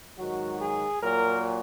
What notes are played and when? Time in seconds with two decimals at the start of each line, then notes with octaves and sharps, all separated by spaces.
0.18 G#2 D#3 F#3 F#4
0.61 G#4
1.02 A#2 F#3 A#4